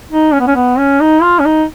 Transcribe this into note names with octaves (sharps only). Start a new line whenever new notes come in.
D#4
C#4
B3
C#4
B3
C#4
D#4
F4
C#4
D#4